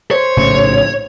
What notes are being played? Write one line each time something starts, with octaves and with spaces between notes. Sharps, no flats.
C5 C#5
A#1 A2 C#3